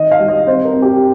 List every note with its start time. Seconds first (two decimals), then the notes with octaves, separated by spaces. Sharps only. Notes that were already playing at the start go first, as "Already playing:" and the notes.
Already playing: D#3 D#5
0.11 F5
0.20 G3
0.28 D#5
0.47 C4 C5
0.65 A#4
0.73 C4
0.82 G4